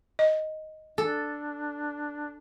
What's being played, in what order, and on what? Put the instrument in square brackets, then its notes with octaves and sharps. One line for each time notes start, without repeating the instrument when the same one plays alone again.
[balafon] D#5
[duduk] D4 [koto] A4